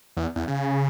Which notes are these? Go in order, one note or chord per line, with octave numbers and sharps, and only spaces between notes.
E2
E2
C#3